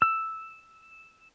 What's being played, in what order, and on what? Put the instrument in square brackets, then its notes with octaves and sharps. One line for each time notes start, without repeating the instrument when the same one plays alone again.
[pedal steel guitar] E6